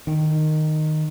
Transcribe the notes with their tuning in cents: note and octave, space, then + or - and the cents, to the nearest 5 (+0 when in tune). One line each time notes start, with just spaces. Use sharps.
D#3 -10